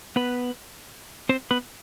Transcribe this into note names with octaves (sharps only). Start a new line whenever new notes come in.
B3 B4
C4 C5
B3 B4